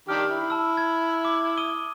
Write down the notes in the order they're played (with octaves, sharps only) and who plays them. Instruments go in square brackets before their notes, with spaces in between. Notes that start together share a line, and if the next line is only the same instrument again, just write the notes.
[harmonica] D#3 D4 G4 [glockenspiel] F6
[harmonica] E4
[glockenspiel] A5 E6
G#6
D6
D#6 D#7 G7